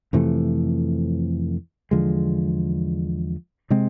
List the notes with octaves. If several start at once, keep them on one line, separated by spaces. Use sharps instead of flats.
F2 C3 E3 A3
E2 D3 F3 G#3
C3 G#3 C4